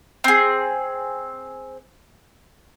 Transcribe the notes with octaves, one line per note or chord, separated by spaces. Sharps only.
C4 G#4